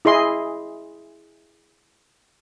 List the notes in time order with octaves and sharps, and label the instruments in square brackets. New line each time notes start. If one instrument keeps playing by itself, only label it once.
[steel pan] E4 G#4 D#5 C6